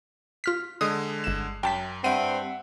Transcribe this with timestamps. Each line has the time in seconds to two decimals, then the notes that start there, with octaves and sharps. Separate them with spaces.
0.44 F4 F6 B6
0.81 D3 G#3 D#6
1.24 G1 E7
1.63 F#2 G5 A5 B6
2.04 G2 G3 C4 E5 F#5 D#7